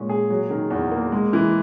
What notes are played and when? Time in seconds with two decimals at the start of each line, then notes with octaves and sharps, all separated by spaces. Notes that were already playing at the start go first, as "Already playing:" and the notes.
Already playing: A#2 G#3 C#4
0.09 G#4
0.30 F#3
0.50 D#3
0.71 E2
0.91 A#3
1.12 G#3
1.33 E3